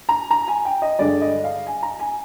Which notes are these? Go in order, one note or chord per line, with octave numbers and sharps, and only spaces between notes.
A#5
A#5
G#5
G5
D#5
G2 D3 G#3 D5
D#5
F5
G#5
A#5
G#5